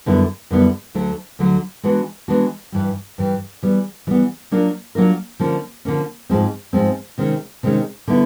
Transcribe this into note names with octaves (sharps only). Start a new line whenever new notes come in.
F#2 D3 G3 B3 E4
F#2 D3 G3 B3 E4
D2 D3 F#3 A3
D2 D3 F#3 A3
E3 G#3 B3 D4 F#4
E3 G#3 B3 D4 F#4
G2 E3 G3
G2 E3 G3
E3 G3 B3
E3 G3 B3
F#3 A#3 D4 F4 A#4
F#3 A#3 D4 F4 A#4
D3 F3 A#3 C#4
D3 F3 A#3 C#4
G#2 F3 G#3 C4
G#2 F3 G#3 C4
C3 D#3 G#3 C#4
C3 D#3 G#3 C#4
D3 G3 B3 E4